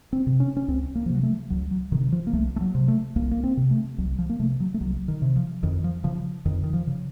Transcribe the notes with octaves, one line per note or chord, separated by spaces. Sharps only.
C4
C3
C#4
C#4
C#2 C4
A#3
F3
C3 F#3
A3
C#2 F#3
F#3
C3 D#3
F3
A#3
C2 A3
A3
F#3
C3
A3
C2 A#3
A#3
C4
C3
A3
C2 F#3
F3
A#3
C3 A3
F#3
A3
C2 F#3
D#3
C3
F3
F2 D#3
F3
C#3 F3
F2 D#3
D#3
F3
C#3